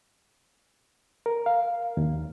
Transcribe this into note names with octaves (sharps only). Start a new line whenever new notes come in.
A#4
F5
D#2